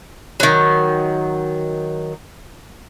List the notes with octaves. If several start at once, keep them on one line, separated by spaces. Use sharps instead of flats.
D#3 F#3